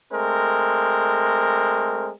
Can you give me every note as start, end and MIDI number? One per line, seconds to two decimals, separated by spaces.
0.12 2.11 56
0.12 2.11 57
0.12 2.11 60
0.12 2.11 70